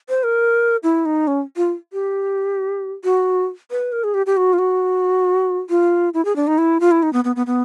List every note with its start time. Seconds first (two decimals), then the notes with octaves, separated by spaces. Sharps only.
0.09 C5
0.23 A#4
0.83 E4
1.05 D#4
1.27 C#4
1.57 F4
1.93 G4
3.04 F#4
3.71 B4
3.92 A#4
4.04 G#4
4.14 G4
4.26 G4
4.37 F#4
4.53 F4
4.58 F#4
5.69 F4
6.14 E4
6.25 G#4
6.36 D4
6.47 D#4
6.58 E4
6.80 F4
6.91 E4
7.03 D#4
7.13 B3
7.24 B3
7.36 B3
7.46 B3